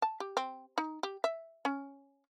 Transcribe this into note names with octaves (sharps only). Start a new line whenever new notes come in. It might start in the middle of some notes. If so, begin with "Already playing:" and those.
A5
G4
C4
D#4
G4
E5
C#4